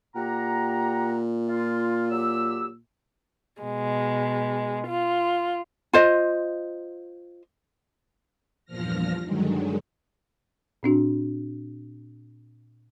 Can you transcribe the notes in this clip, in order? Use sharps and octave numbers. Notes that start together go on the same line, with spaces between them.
A#2 G4 F#5 A#5
F4
F#3 G4 E6
B2 G#3
F4
F4 C5 D#5
E2 G2 A#2 F3 F6 A#6
G2 D3 D#3 F#3 G#3
A#2 C4 D4 F#4